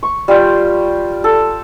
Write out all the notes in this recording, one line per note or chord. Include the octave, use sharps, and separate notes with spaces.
C#6
G3 F4 F5 G5
A4